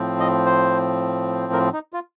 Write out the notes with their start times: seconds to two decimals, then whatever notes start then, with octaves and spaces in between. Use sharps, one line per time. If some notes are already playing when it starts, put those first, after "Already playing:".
Already playing: A2 F3 C4
0.20 D#5
0.46 C5
1.53 A#4
1.73 D#4
1.93 F4